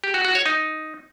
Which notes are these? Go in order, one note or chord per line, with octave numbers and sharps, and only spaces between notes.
G4
F#4
F#4
C#5
D#4